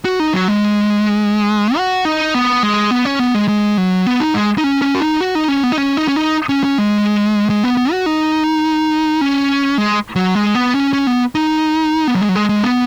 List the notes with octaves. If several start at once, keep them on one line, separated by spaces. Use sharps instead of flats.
F#4
D#4
F#3
G#3
F#4
D#4
B3
G#3
B3
C#4
B3
G#3
G#3
F#3
B3
D#4
G#3
D#4
C#4
C#4
F#4
D#4
F#4
D#4
C#4
B3
D#4
C#4
D#4
C#4
D#4
C#4
C#4
G#3
G#3
B3
B3
F#4
D#4
C#4
G#3
F#3
G#3
B3
C#4
C#4
B3
D#4
B3
F#3
G#3
F#3
G#3
G#3
B3